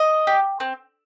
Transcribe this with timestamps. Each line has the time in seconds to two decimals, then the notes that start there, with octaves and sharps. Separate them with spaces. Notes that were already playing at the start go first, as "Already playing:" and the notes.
Already playing: D#5
0.27 G4
0.60 C4